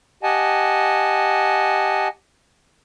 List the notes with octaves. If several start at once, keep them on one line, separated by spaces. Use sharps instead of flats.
G4 D#5 F#5 G#5 A5